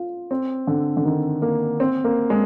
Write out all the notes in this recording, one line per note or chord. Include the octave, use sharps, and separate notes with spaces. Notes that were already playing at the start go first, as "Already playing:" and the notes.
Already playing: F4
C4
D3
D3
D#3
A#3
C4
A#3
G#3